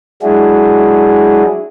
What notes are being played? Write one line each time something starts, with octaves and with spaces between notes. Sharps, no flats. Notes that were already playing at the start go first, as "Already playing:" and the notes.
F#3 G#3 D4 E4 F#4 G#4